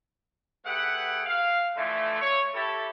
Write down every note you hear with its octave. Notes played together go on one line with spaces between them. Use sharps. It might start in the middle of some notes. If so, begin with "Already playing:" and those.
A3 G4 G#4 B4 F#5
F5
D3 E3 F3 A3
C#5
E4 G4 A4